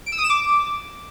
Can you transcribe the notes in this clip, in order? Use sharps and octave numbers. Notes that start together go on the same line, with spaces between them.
D7
E6
D#6
E7
D6